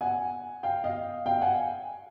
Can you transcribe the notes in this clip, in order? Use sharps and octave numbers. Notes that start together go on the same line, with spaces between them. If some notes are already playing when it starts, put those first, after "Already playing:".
F#5 G#5
F5 G5
D#5 F5
F5 G5
F#5 G#5